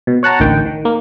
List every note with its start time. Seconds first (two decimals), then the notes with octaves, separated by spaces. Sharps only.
0.07 B2
0.23 C#5 F#5 A5 A#5
0.40 A1 D2 D#3 G5
0.66 D#3
0.85 A#3